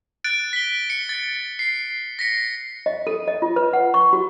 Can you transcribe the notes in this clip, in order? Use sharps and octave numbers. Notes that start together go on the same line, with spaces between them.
F#6 A6 D7
B6 G7
C#7
A6
C7
A#6 B6 C#7
D#5
A4
D#5
F4
B4
F#5
C#6
F#4